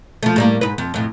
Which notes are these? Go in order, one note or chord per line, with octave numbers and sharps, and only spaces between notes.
F3 A3
A2 G3 A#3
G#2 B4
F2
F2 A2